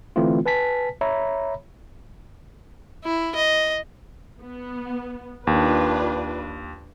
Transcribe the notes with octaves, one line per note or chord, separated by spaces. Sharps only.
D3 E3 A3 C4 E4 F4
B4 G#5 A5 B6
C#5 E5 A#5 B5
E4
D#5
B3
D#2 D4 F4 B4